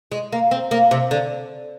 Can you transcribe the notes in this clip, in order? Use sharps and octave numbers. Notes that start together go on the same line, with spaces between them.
G#3
A#3
C4
A#3
C3
D3